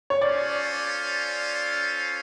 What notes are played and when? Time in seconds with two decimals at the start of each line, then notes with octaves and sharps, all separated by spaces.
0.10 C#5
0.21 C#4 F4 A4 C5 D5 F5